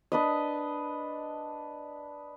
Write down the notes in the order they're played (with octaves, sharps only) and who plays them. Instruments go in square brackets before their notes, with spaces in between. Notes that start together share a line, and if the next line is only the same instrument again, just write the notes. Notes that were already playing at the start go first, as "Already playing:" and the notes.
[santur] D4 B4 D#5